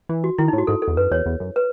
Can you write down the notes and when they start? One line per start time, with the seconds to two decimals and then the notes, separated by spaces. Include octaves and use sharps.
0.09 E3
0.24 F#4
0.38 D#3 E4
0.48 D#4
0.53 A2
0.58 F#4
0.67 G#2 A4
0.82 A4
0.88 E2
0.97 F#2 B4
1.11 E2 C#5
1.26 E2
1.40 F#2
1.56 B4